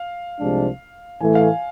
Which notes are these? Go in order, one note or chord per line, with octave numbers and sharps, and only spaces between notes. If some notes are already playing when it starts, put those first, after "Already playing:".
Already playing: F5
C2 C3 F3 G#3 D4
A2 E3 A3 G#5
F5
G#5